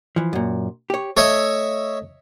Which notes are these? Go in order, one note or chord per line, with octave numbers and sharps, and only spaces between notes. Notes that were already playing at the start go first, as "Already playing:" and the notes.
E3 F3
F#2 A#2
G4 C#5
A3 C#5 D#5 E5